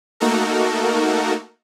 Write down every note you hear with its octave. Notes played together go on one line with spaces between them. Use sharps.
A3 A#3 D#4 F#4 A4 A#4